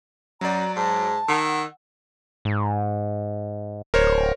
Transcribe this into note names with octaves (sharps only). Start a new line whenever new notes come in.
F#2 F#3 D5 A#5
G#2 A5
D#3 F#5 E6
G#2
D1 A#4 C5 C#5